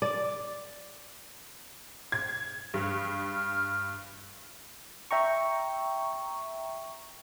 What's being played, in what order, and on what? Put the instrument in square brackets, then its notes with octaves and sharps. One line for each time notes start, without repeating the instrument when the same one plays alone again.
[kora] D5
[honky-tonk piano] G#6
G2
[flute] F6
[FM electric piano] E5 G5 A#5 C#6